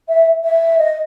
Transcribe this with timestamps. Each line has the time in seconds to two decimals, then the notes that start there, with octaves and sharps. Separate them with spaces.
0.08 E5
0.44 E5
0.78 D#5